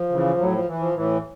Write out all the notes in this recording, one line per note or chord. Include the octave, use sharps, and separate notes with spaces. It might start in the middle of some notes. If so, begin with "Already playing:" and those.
Already playing: F3
C#3 E3
A2 F#3
F3
E3
F3
A2 E3